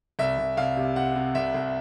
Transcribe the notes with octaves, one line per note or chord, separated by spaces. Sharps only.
C2 E5
C2
C2 F5
C3
C3 F#5
C3
C2 E5
C2